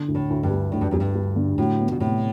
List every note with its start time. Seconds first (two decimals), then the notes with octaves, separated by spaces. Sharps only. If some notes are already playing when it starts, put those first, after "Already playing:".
Already playing: D3
0.08 D2
0.15 A2
0.30 D2
0.43 G2
0.50 G3
0.72 D2 A2
0.81 G2
0.91 F#2 G3
1.00 G2
1.15 G3
1.36 D3
1.58 A2 F#3
1.79 B3
1.91 B2
2.00 A2 C3